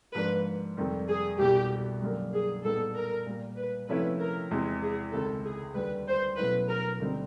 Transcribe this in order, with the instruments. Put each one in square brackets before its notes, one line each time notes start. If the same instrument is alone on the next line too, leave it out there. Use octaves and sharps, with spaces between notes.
[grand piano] G#2 F3 A#3 D4 [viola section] B4
[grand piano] F2 C3 D#3 G3
[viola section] G#4
[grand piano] C2 B2 G3 [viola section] G4
[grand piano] F#2 D3 G3 A#3
[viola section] G#4
[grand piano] A#2 G3 B3 D#4 [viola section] A4
[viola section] A#4
[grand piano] A#2 G3 A#3
[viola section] B4
[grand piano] C3 F3 A3 C#4 E4 [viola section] B4
[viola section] A#4
[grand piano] E2 C3 E3 G#3 [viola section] G#4
[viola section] G#4
[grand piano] C#2 C3 D#3 G#3 [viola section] A4
[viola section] G#4
[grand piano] D#2 D3 G3 [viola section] B4
[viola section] C5
[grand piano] B2 F#3 A3 C#4 E4 [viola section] B4
[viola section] A#4
[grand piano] D2 D3 G3 C4 D#4